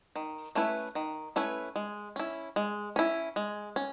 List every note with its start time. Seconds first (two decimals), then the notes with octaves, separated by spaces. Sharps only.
0.15 D#3
0.55 A3 C#4 E4 B4
0.95 D#3
1.36 A3 C#4 E4 B4
1.76 G#3
2.16 C#4 E4
2.56 G#3
2.96 C#4 E4
3.36 G#3
3.76 C#4